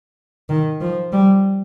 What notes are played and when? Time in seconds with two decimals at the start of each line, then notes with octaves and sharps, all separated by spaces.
0.49 D#3
0.80 F3
1.12 G3